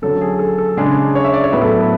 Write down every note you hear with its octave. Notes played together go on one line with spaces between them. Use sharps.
D3 F#3 A3 C#4 A4
G#4
A4
A4
C#3 G#3 D4 G#4
C#5
E5
D5
C#5
A2 F#3 B3 E4 B4
A4
B4